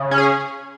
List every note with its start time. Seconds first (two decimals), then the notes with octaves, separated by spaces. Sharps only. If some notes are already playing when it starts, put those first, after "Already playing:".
Already playing: C#3
0.11 C#4
0.18 G#4